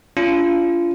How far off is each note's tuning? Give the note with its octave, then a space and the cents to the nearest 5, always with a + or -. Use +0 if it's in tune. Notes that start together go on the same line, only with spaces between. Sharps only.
D4 -40 F4 -25